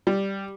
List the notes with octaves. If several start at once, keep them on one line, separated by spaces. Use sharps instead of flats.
G3